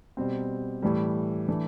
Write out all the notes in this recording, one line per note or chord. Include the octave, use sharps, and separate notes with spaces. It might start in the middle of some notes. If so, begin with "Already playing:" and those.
B2 G3 C4
A2 E3 G3
E3 A3 D4